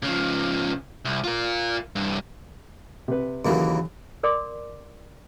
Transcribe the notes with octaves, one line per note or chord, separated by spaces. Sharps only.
C#3 F3
C2
F4 A#4
C2 G2
C3 B4
D#2 C#3 E3 F#3 A#3
A#4 D5 C6 D6